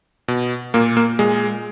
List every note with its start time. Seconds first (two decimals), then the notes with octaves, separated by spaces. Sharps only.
0.28 B2
0.74 A#2 A#3
0.97 A#3
1.19 A#2 G#3